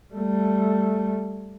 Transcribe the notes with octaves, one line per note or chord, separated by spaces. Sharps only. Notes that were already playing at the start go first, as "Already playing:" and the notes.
G3 A3